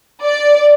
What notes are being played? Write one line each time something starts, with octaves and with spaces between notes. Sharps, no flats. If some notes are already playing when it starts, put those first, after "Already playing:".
D5